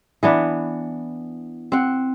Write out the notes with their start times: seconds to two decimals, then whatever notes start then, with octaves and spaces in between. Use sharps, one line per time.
0.23 E3 B3 D4
1.72 C4 F#5